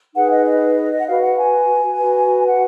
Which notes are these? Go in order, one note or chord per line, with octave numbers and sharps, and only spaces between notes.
D#4 G#4 B4 F#5
D#5
D#5
F#5
F#4 B4 F5
F#5
G#5
F#4 B4
F#5